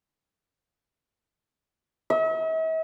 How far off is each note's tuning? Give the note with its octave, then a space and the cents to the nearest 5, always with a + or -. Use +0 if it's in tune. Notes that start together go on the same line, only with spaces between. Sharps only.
E5 -45